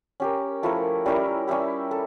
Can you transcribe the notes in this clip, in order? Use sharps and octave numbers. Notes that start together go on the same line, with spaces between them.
C#4 G4 A#4
F3 A3 E4 A#4
G3 C#4 E4 A#4
G3 C#4 E4 G4
A4